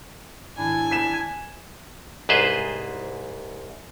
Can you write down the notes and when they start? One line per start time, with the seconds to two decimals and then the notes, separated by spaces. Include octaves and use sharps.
0.58 G#1 D4 E4 G#5
0.91 B6 E7
2.29 C2 G#2 G#4 B4 C5